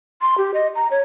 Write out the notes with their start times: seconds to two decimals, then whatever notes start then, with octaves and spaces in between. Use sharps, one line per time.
0.22 C6
0.38 G4
0.54 D#5
0.75 A#5
0.91 C#5